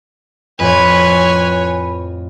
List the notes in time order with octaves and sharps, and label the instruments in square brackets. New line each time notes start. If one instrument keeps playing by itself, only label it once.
[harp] F2 A2 [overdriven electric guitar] B4 [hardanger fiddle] C#5 G#5